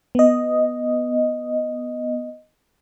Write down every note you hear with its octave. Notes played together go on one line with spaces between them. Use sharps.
B3 D#5